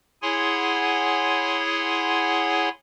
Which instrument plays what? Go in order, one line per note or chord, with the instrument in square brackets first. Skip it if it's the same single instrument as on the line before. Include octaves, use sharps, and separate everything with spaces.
[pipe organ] E4 G#4 C#5 F#5 G#5 C6